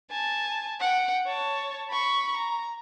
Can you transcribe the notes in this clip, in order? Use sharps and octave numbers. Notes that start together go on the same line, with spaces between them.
G#5 A5
F#5 G5
C#5 A5
B5 C#6
A#5